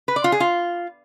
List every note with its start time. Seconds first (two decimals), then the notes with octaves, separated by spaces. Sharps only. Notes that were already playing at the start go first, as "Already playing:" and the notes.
0.08 B4
0.16 D5
0.24 F4
0.32 G#4
0.40 F4